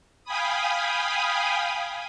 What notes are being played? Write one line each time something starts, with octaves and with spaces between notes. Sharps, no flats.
F5 G5 G#5 B5 D#6